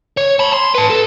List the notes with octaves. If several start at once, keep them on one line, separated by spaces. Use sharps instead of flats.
C#5
A5 B5
C6
B4 A5
A4